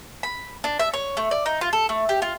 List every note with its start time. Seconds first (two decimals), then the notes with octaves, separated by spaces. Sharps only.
0.23 B5
0.64 D4
0.79 E5
0.93 C#5
1.17 A3
1.31 D5
1.46 D#4
1.61 F4
1.73 A4
1.89 A3
2.09 G4
2.22 F4